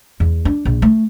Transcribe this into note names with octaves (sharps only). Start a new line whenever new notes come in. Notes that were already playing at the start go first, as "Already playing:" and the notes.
E2
D4
A#1
A3